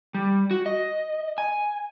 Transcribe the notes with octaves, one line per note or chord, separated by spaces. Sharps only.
G3
F#4
D#5
G#5